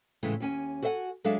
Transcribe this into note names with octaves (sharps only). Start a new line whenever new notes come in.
A2 C#3 E3 G#3 A3
D#2 C#4 G#5
F#4 A4 B4 E5 F#5 G#5
F#3 G#3 D4 A4 E5 F5